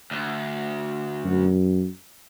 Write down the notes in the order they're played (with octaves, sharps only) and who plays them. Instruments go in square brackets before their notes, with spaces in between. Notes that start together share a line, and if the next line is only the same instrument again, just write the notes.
[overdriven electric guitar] D2
[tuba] F#2